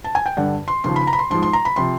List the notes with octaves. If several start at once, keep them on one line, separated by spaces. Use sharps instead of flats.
A5
G#5
G5
G2 D3 G3 F#5
C6
D#2 C#3 F3 C6
B5
A#5
B5
C6
G#2 F3 G#3 C6
C6
A#5
B5
C3 F3 C6